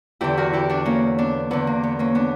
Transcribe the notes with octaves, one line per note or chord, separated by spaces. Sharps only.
E2 D3 E4 G4
F#4 A#4
E4 G4
D4 F#4
A#3 C#4
B3 D4
E2 D3 B3
A#3
B3
A#3 C#4
B3 D4